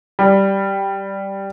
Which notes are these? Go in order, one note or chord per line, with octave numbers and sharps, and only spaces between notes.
G3